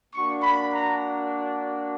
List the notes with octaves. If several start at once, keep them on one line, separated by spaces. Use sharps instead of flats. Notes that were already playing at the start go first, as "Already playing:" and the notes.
A#3 D4 F#4 C#6
B5
A#5